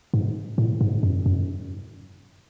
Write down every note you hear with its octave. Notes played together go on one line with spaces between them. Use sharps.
G#2
A2
G#2
F#2
F#2